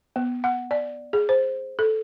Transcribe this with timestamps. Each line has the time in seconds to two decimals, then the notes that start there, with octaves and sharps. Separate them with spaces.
0.16 B3
0.44 F#5
0.71 D5
1.13 G#4
1.29 C5
1.79 A4